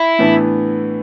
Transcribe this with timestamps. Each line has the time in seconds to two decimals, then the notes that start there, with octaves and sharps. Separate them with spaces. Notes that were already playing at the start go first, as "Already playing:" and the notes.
Already playing: E4
0.19 A2 E3 B3 D4